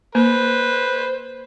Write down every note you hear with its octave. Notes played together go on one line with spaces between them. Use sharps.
A#3 B4 C5